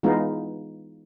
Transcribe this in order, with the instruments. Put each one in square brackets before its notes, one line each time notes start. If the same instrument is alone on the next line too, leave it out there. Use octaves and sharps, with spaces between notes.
[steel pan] E3 G#3 B3 D#4 F4